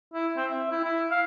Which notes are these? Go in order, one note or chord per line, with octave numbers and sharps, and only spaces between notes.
E4
C4
E5
E4
E4
F5